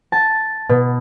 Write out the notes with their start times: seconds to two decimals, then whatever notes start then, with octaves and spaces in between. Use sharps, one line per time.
0.12 A5
0.69 B2